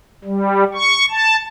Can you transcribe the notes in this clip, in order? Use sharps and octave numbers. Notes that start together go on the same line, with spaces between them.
G3
C#6
A5